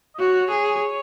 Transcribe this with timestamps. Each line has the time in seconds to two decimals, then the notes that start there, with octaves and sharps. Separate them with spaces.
0.15 D#5
0.19 F#4 C#5
0.50 G#4